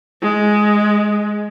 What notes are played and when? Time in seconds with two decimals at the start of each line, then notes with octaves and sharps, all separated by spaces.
0.22 G#3